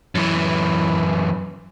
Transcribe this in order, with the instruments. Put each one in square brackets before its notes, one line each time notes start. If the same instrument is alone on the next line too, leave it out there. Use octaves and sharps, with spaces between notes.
[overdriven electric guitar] F#2 E3